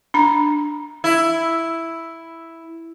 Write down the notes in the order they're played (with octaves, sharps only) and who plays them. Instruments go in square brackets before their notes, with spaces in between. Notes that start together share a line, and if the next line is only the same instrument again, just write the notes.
[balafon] D4 A#5
[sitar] E4